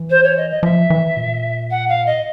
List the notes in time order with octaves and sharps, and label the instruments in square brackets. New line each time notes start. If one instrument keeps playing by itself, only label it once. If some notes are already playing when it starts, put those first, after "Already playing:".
Already playing: [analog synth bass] E3
[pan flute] C5
C#5
D#5
D#5
[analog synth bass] F3 [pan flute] E5
[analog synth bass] E3
A#2
[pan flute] F#5
F5
D#5